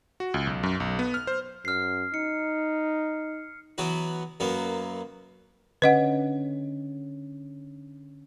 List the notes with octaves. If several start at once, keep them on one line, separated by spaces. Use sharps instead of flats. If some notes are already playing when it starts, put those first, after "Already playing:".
F#4
C#2
B1
F#2
B1
B3
F6
C5
F#2 F6 C7
D#4 C#7
E3 F#3 B3 F#4
F#2 F#3 A#3 B3
D3 C#4 B4 D#5 F#5